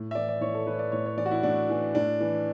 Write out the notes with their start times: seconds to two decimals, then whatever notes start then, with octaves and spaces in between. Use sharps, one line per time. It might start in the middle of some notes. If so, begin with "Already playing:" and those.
Already playing: A2
0.11 E5
0.15 E3 D5
0.28 D5
0.41 A2 C#5
0.54 A4
0.67 E3 B4
0.74 C#5
0.79 D5
0.92 A2 C#5
1.06 C#5
1.17 E3 D5
1.26 F#4
1.31 E4
1.43 A2 D4
1.70 E3
1.95 A2 D4
2.20 E3